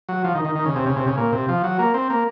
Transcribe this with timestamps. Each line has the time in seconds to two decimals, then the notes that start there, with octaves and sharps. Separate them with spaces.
0.09 F#3
0.24 F3
0.35 D#3
0.45 D#3
0.55 D#3
0.65 C#3
0.76 C3
0.86 C#3
0.96 C3
1.07 C#3
1.17 A#2
1.32 C3
1.48 F3
1.64 F#3
1.79 A#3
1.94 C4
2.10 A#3